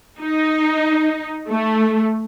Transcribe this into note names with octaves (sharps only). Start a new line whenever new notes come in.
D#4
A3